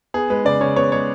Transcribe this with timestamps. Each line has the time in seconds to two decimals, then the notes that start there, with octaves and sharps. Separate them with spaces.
0.14 B3 G#4
0.30 G#3 B4
0.45 C#3 D5
0.61 C#3 C#5
0.76 B3 C#5
0.92 G#3 C#5